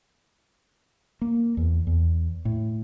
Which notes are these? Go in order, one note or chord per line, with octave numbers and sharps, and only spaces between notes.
A#3
E2
E2
A2